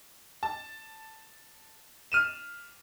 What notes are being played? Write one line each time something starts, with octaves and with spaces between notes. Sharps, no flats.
A5
F6 D#7 E7